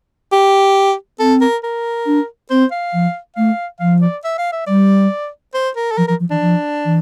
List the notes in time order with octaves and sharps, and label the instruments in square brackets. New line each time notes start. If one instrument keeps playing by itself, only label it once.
[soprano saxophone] G4
[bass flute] C4 [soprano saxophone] A4
[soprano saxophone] A#4
A#4
[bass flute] D4
[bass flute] C4 [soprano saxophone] C5
[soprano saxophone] F5
[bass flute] F3
[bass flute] A3 [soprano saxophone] F5
[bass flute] F3 [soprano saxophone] F5
[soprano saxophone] D5
E5
F5
E5
[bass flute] G3 [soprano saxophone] D5
[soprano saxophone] C5
A#4
A4
[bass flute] F3 [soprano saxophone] A#4
[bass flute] F3 [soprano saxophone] A#4
[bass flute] F3
[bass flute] E3 [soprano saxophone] D4
[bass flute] F3
E3